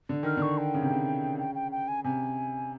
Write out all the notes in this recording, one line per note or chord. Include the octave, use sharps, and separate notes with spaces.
D3
D#3 F6
D3 C#6
G5
C#3
C3
C#3
G5
G5
G5
G#5
C3 G#5